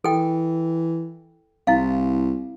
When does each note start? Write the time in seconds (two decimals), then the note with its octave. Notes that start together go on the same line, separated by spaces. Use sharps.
0.04 E3 A4 G5
1.67 C2 E4 F5